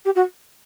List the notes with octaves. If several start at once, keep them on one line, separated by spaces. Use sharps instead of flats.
G4
F#4